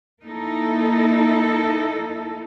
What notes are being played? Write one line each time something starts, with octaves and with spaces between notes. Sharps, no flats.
A#3 D#4 E4 A4